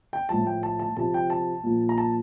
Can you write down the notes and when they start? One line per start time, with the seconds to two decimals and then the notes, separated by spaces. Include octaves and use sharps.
0.13 G5
0.29 A2 F3 A5
0.47 G5
0.63 A5
0.79 A5
0.97 C3 F3 A5
1.14 G5
1.30 A5
1.64 A#2 F3
1.89 A#5
1.98 A5